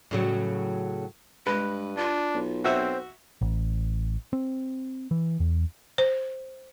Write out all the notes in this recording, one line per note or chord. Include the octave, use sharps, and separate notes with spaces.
A2 C#3 F#3
G2 G#3 B4
D4 F4
B1
C4 F#4 C5 E5
A1
C4
E3
E2
C5